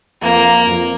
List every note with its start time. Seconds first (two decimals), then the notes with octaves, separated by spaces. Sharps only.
0.22 F2 A#3
0.67 F2